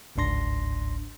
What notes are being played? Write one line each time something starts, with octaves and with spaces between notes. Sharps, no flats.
G1 C#2 G#2 D4 C6 A#6